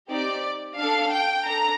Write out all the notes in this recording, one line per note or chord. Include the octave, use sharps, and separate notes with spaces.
C4 D#4 G4 D5
D4 A4 F5
G5
D4 A4 A#5